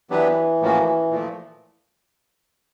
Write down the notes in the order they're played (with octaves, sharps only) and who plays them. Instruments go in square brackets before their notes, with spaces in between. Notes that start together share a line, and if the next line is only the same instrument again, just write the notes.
[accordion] E3 [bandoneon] F#3 B3 D4 G4 B4
[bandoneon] A2 F3 A#3 C#4 F#4
A#2 F3 A3